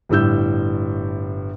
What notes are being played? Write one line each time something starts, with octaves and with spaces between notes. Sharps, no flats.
G1 A2 G3 E6 G6